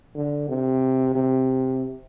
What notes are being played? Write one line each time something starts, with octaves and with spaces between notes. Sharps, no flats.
D3
C3
C3